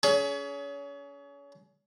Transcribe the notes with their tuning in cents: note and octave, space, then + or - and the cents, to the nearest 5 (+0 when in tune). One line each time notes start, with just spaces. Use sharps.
C#4 +30 G#4 +25 C#5 +35